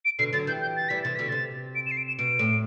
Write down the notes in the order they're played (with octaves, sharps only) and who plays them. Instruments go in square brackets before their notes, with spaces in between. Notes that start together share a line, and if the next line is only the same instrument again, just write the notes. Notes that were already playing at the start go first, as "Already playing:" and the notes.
[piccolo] D7
[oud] B2 D3 [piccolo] C7
[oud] D3 F#3 [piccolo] A6
[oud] E3 G3 [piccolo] G6
[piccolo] G6
A6
[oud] E3 G3 [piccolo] B6
[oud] C3 E3 [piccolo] A6
[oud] B2 D3 [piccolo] B6
[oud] C3 [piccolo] A6
[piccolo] D7
E7
C7
D7
E7
[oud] B2 [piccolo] D7
[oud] A2